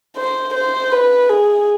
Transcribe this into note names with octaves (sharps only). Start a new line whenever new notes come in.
C5
C5
B4
G#4